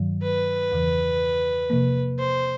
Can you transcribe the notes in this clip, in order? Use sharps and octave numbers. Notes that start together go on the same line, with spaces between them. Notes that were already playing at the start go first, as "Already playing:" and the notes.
Already playing: G2 D#3 F#3
B4
E2 C#3 E3
C3 F3 A#3
C5